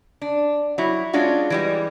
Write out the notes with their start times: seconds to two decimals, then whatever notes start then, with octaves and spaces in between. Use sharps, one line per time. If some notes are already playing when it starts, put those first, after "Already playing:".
0.22 D4
0.78 F#3 E4
1.13 G#3 C#4 D4 F4 F#4
1.50 E3 G3 G#3